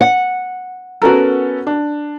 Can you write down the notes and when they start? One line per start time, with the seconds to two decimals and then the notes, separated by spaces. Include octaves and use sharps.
0.01 F#5
1.02 B3 C#4 F#4 A4 A#4
1.67 D4